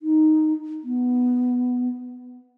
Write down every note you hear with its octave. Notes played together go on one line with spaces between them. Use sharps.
D#4
B3